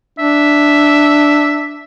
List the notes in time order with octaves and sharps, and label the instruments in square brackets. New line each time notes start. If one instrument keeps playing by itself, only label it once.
[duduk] D4 [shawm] E5